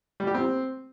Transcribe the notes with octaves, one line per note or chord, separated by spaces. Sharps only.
G3
G4
C4